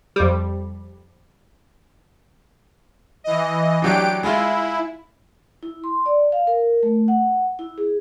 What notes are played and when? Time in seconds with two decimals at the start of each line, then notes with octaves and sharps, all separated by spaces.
0.16 F2 G3
3.24 E3 D#5
3.82 E3 F#3 D4 G4 D7
4.23 G#3 E4 F4
5.63 E4
5.84 C6
6.06 D5
6.32 F5
6.47 A#4
6.83 A3
7.08 F#5
7.59 E4
7.78 G#4